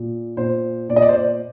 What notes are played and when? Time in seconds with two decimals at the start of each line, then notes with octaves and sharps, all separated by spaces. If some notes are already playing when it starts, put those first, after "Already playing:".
Already playing: A#2
0.37 A#2 C5
0.89 A#2 D5
0.96 D#5
1.02 D5
1.09 C5
1.15 D5